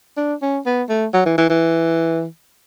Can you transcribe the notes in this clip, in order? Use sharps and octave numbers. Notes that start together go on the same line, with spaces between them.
D4
C#4
B3
A3
F#3
E3
E3
E3